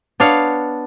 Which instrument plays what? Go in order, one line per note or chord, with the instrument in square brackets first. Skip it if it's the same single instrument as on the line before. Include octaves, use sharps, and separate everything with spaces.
[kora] B3 D4 C#5 F5